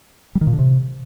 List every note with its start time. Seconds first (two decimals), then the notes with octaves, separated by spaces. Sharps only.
0.35 G3
0.41 D#3
0.47 A#2
0.53 D3
0.59 C3